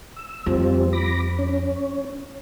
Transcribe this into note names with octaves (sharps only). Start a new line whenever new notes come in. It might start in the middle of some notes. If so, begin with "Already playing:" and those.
E6
F2 F3 G3 C4
B5 D6 A#6
C#4